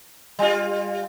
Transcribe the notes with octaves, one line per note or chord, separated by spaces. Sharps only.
G3 F4